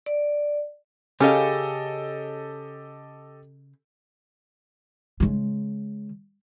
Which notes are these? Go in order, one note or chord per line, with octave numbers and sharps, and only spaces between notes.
D5
C#3 C#4 G4 A4 D#5 F5
C#3 G#3